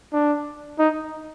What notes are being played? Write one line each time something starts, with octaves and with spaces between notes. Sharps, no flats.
D4
D#4